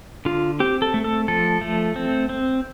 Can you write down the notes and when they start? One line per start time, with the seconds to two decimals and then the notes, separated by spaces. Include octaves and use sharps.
0.25 D3 F4
0.60 C4 G4
0.82 A4
0.94 A3
1.04 A4
1.28 F3 A4
1.61 A3
1.96 C4
2.29 C4